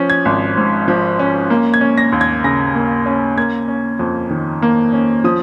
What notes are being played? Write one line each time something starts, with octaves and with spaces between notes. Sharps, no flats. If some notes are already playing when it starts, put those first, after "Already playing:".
Already playing: F3 C#4
G#6
G#1
G#2
F3
C#4
A#3
G#6
C#4
A#6
D#2
G#6
C#3 A#6
A#3
C#4
A#3 G#6
C#4
F2
D#3
A#3
C#4
F3 D#6